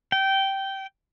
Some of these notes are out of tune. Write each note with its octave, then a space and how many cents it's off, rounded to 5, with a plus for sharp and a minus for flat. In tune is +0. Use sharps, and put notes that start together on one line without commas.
G5 -15